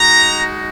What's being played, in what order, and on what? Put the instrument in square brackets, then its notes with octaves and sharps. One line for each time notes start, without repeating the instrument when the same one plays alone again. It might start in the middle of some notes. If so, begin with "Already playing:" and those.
Already playing: [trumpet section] G#3 D#4 F#4 A#5